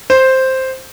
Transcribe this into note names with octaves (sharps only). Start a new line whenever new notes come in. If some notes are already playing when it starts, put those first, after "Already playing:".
C5